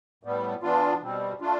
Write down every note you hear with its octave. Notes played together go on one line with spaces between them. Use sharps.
A2 G3 B3
E3 B3 D4 F4
B2 G3 C4
A3 D4 F4